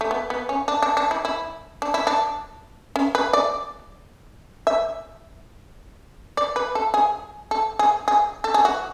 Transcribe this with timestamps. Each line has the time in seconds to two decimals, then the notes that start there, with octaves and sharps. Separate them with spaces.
0.01 A3
0.11 B3
0.30 B3
0.49 C#4
0.68 D4
0.83 D4
0.97 D4
1.11 E4
1.25 E4
1.82 D4
1.94 E4
2.07 D4
2.96 C#4
3.15 B4
3.33 D5
4.67 E5
6.37 D5
6.56 B4
6.75 A4
6.94 G#4
7.51 A4
7.79 G#4
8.08 G#4
8.44 A4
8.54 G#4
8.65 F#4